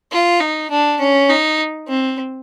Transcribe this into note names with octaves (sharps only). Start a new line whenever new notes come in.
F4
D#4
D4
C#4
D#4
C4